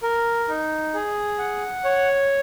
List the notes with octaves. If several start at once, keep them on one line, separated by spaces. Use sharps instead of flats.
A#4
D#4
G#4
F#5
C#5